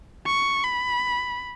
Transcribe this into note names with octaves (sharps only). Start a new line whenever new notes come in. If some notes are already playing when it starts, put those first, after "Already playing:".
C#6
B5